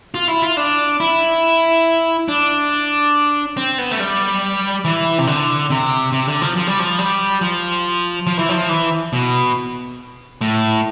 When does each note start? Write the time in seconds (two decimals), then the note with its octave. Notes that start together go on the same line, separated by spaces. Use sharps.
0.14 F4
0.28 E4
0.42 F4
0.57 D4
1.00 E4
2.29 D4
3.57 C4
3.78 B3
3.91 A3
4.00 G3
4.85 E3
5.18 C3
5.27 D3
5.70 C3
6.13 C3
6.27 D3
6.42 F3
6.56 F3
6.67 G3
6.80 F3
6.99 G3
7.41 F3
8.27 F3
8.39 E3
8.49 F3
8.69 E3
9.13 B2
10.41 A2